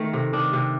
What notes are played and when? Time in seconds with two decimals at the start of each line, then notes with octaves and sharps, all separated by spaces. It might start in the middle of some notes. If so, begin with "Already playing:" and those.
Already playing: D#3 A3
0.13 C3
0.33 D#3 D4
0.53 C3